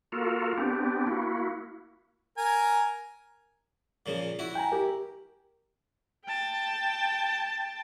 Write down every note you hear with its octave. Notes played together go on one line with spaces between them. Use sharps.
A#3 F4 F#4 A4 A#4
B3 C4 D4 G4
A#3 E4 F#4
A#4 G#5
A#2 C#3 F3
E4 F#4
G5 G#5 A#5
G4 A#4
G5 A5